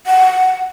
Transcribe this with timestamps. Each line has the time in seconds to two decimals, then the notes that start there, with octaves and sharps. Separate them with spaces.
0.07 F#5